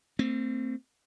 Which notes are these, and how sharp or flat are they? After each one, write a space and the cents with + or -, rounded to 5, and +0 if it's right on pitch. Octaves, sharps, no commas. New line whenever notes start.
A3 +45 C4 +0